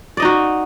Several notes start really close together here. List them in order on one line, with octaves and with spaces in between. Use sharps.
D5 D#5 D#4 F#4